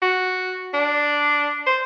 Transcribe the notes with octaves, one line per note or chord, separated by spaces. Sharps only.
F#4
D4
C5